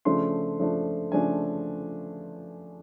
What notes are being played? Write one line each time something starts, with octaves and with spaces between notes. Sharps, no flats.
C#3 F3 A3 D4 C6
C#3 F3 A3 D4
C#3 F3 A3 D4 G#5